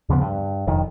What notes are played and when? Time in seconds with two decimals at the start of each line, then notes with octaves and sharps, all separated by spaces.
0.09 D#2 C#3 F3 B3
0.22 G2
0.67 E1 F2 D#3